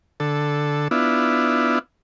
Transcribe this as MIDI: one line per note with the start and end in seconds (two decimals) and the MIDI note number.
0.20 0.88 50
0.20 0.88 69
0.91 1.79 59
0.91 1.79 62
0.91 1.79 64
0.91 1.79 65